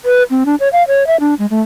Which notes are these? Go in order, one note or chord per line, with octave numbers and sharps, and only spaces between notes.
B4
C4
D4
C#5
F5
C#5
E5
D4
G#3
A3